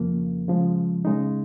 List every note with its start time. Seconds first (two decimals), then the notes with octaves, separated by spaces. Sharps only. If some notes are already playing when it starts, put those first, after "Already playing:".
Already playing: F2 C#3 F3 A#3
0.48 C#3 F3 G#3
1.05 C#3 G#3 D#4